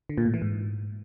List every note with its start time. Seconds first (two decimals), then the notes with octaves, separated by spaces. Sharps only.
0.09 D3
0.18 A#2
0.26 A2
0.34 E3
0.42 G#2